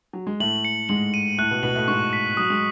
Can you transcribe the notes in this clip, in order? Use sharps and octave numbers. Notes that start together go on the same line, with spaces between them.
F#3
G#3
A2 A3 F#7
C#7
G#2 G#3 F#7
D#7
A2 A3 F#6
B2 B3
B2 B3 F#7
A2 A3
G#2 G#3 C#6
B6
F#3 D#6
G#3